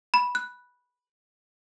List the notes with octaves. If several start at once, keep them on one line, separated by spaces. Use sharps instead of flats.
B5
F#6